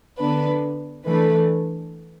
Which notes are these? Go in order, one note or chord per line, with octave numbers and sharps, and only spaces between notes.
D3 B3 D4 B4
E3 A3 D4 B4